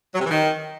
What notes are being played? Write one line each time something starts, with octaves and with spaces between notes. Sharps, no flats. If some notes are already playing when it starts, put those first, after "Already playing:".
F#3
C3
E3
D#3